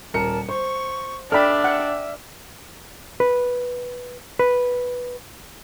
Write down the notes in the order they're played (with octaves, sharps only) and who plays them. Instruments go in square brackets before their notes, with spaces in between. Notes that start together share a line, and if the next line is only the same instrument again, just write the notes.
[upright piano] D#1 A#4 C#7 [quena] A5
[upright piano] C5 [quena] C#6
[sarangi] D4 [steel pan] A4 D5 B5 [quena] E5 [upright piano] G5 F6
[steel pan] F#5
[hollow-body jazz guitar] B4
B4